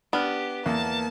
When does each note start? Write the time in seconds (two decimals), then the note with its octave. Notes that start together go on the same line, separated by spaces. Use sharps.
0.13 B3 D4 G4 F6
0.66 E2 A#3 A5